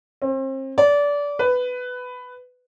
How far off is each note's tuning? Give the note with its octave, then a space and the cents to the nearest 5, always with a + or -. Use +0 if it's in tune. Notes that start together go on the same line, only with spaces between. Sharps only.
C4 +35
D5 -25
B4 +10